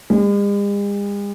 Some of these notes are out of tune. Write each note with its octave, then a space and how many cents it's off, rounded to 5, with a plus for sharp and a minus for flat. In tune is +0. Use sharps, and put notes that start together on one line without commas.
G#3 -45